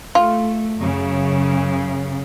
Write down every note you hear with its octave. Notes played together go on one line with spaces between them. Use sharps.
A3 F4
F#2 C#3